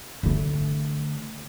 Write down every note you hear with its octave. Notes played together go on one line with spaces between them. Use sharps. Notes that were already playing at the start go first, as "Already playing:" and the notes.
D3 A3